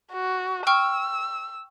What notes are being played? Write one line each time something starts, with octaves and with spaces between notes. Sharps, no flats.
F#4
G5 C#6 E6 F6